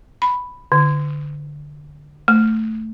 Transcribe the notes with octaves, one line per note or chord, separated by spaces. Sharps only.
B5
D3
A3